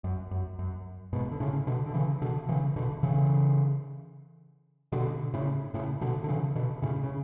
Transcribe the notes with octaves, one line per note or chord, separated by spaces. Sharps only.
F#2
F#2
F#2
G#2 B2
D3
A2 C#3
B2 D3
D3
C#3 E3
B2 D3
C#3 E3
B2 D3
C#3 E3
B2 D3
A2 C#3
A2 C#3
B2 D3
D3
C#3 E3
B2 D3
A2 C#3
C#3